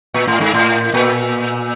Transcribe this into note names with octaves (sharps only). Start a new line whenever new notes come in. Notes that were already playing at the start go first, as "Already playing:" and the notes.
A#2
A2
G#2
A2
A#2